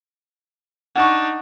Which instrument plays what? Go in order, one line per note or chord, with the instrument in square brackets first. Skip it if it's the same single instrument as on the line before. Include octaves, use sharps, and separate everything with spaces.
[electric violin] D4 D#4 [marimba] F#5 C#6